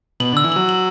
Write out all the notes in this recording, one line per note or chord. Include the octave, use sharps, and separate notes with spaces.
B2 F#7
D3 E6
E3
F#3 F#7
F#7